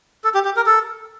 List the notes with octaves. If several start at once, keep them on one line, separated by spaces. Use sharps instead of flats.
A4
G4
G4
A#4
A4